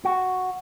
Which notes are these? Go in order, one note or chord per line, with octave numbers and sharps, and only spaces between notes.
F#4